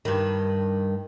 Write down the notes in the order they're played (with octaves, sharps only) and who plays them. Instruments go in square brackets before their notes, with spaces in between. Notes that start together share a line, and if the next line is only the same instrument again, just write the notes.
[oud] G2 D#3